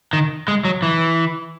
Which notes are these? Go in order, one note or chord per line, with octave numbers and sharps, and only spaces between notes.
D#3
G#3
F#3
E3